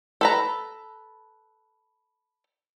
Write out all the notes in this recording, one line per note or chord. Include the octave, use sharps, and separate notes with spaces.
A4 B4 A#5